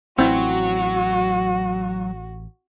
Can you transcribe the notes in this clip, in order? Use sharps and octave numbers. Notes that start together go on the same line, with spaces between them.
A1 F#3 C4 E4 F#4